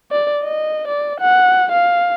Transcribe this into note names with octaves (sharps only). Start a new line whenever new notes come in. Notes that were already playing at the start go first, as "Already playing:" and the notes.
D5
D#5
D5
F#5
F5